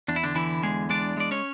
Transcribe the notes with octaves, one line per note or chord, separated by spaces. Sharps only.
E2 D4
E4
D3 D4
D3 E3 E4
E2 G#3 G#4
G#3 D4 D5
G#3 D5
C#4 C#5